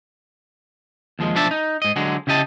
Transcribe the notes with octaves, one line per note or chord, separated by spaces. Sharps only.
D#2 F3 G#3
B1 F3 D4 E5 A5
D#4
G#2 D#5
D3 F#3 G#3
C#3 E4 G4 D#5 A5